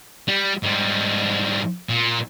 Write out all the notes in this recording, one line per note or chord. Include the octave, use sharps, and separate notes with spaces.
G3
G#2 G3
A#2